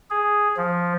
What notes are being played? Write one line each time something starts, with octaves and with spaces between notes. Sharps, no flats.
G#4
F3